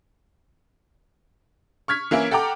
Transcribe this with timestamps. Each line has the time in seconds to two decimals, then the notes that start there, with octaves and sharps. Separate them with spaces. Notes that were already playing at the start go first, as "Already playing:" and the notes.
1.88 C#6 F6 G#6 B6
2.11 E3 A#3 C#4 E4
2.31 A4 F#5 G5 A#5 D6